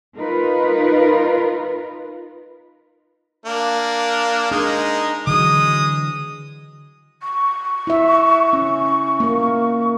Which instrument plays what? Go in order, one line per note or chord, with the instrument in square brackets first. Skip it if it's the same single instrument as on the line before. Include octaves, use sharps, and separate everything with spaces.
[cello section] D#4 F4 A#4 B4
[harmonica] A#3 D4
[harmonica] G#3 D#4 A#4 [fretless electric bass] D4
[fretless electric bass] D3 E3 F#3 [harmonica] G#3 D#6
[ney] C#6
[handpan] E4 E5
C#4
A#3 A#4